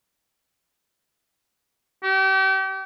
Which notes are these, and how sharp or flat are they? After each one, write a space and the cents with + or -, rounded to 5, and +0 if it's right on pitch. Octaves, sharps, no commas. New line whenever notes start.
G4 -35